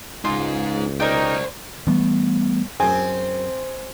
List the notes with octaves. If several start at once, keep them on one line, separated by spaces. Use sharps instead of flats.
C#2 G#3 D#4 F4
D#4 A#4 C5 D5 G5
E3 G3 A3 B3
F#2 C4 G#4 G#5